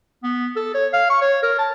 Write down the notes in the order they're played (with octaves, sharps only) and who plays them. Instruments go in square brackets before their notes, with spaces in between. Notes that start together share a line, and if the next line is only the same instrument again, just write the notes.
[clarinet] B3
A4
C#5
F5
C#6
C#5
A#4
A5